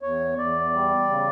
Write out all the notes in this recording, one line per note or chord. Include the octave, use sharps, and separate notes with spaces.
E2 C#5
E2 D5
G3
C#3